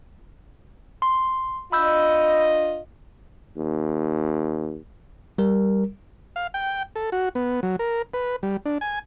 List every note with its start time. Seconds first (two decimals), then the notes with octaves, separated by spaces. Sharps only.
1.02 C6
1.72 D4 F4 D#5 B5 E6 G6
3.56 D#2
5.38 G3 A#4
6.36 F5
6.54 G5
6.96 A4
7.12 F#4
7.35 B3
7.63 F#3
7.79 A#4
8.14 B4
8.43 G3
8.65 D4
8.81 G#5